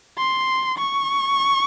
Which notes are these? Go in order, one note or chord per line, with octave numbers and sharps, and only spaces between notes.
C6
C#6